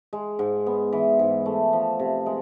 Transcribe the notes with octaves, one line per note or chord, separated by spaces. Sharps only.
G#3
G#2
B3
E3
G#2
A3
F3
C3
G#3